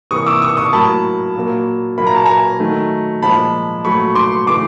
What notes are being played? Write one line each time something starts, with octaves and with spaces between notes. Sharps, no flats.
C3 E3 G3 A#3 C#6 D#6
D6 E6
C#6 D#6
C#6 D#6
A2 F#3 A#3 A5 B5
A#2 F#3 A#3
A#2 F#3 A#3 B5
A#5
A5
G#5 A#5
D#3 F#3 A3
A#2 F3 G#3 A5 B5
A#2 F#3 A3 B5 C#6
C6 D6
C#3 E3 A3 C6 D6